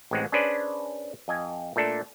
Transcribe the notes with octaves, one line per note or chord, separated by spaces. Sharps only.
A1 A2 G#3 C4 F#5
C#4 D4 G#4 B4 C5 D5
F2 D#5 G#5
A#2 A3 D4 A4